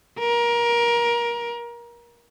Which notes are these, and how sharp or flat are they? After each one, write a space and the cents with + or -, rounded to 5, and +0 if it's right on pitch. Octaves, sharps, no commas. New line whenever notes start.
A#4 +25